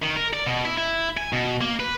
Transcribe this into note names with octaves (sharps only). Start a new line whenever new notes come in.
D#3
A#4
D5
B2
E4
E4
G#5
B2
A#3
B4